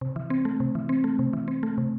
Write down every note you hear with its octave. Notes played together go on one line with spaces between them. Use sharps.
C3
E3
C4
A3
C3
E3
C4
A3
C3
E3
C4
A3
C3